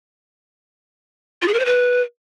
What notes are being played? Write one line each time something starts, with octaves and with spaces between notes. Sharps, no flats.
F4
G#4
A#4
C5
B4